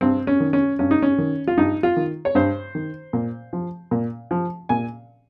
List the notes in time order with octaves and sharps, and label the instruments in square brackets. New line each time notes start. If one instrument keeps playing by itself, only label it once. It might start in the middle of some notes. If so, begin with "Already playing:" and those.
[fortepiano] G2 C4
C#4
D#3
C#4
G2 C#4
D#4
C#4
D#3
F4
G2 D#4
F4
D#3
C#5
G2 C5
D#3
A#2
F3
A#2
F3
A#2 G#5